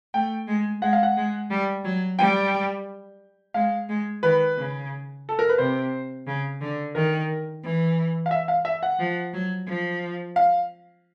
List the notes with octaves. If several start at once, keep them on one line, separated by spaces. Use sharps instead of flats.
A3 G5
G#3
G#3 F#5
F5
F#5
G#3
G3
F#3
G3 G5
G#3 F5
G#3
D#3 B4
C#3
A4
A#4
B4
C3 C5
C#3
D3
D#3 A#4
E3
F5
E5
F5
E5
F#5
F3
F#3
F3
F5